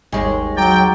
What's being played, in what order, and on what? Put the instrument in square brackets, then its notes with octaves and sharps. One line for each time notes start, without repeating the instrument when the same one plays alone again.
[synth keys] G#1 G#5 C#6 [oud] D#2 G#3
[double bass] F#3 [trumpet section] G5 [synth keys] A#5 D6 A6